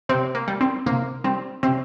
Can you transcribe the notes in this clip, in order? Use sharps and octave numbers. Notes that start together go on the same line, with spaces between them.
C3 C4
A#3
G3
C4
C3 A#3
G3 C4
C3 C4